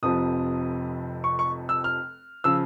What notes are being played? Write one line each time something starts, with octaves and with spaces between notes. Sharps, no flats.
F1 F2 C3 F3 D#6
C#6
C#6
E6
F6
C#3 F3 E6